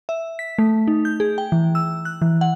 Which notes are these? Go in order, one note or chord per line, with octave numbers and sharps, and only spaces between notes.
E5
B6
A3
D#4
G6
G#4
G5
E3
E6
F#6
E3
F#5